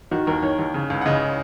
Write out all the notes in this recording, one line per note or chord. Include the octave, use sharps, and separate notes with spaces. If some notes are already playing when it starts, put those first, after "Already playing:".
D#3 F#4
D#2 A#4
D#3 C#5
D#2
C#3
C#2
F#5
C#3 D#5